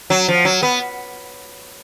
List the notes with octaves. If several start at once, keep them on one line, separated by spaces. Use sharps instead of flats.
F#3
F3
F#3
B3